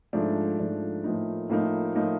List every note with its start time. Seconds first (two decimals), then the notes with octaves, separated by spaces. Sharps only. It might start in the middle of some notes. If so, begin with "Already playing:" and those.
0.13 G#2 F3 A3 D4
0.58 G#2 F3 A3 D4
1.04 A2 F3 A#3 D#4
1.49 A2 F3 A#3 D#4
1.95 A2 F3 A#3 D#4